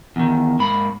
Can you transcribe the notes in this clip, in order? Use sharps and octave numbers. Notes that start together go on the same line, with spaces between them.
E2 D#3
G#2 A#3 B5